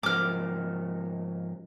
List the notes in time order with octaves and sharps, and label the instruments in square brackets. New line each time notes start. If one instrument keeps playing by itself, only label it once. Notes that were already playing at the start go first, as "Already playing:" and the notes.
[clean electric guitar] G#2 F3 A#3 [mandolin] D6 F6